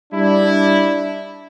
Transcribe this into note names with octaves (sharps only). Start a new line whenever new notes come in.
G3 D4 E4